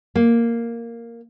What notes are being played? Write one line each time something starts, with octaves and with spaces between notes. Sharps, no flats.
A#3